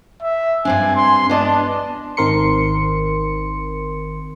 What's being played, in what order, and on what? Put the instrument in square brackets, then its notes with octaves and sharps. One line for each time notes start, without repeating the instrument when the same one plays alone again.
[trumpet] E5
[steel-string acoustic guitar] G2 C4 D4 [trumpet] G#5
[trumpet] C6
[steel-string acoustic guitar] B3 D#5 A5 [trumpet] D4
[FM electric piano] G#1 D#3 C4 A#4 C6 C#7